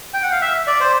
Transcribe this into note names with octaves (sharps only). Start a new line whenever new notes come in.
G5
F#5
F5
E5
D5
C5